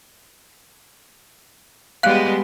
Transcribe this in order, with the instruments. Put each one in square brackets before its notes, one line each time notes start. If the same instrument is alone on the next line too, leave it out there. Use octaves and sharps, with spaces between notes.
[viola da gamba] G3 G#3 B3 [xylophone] F5 F#6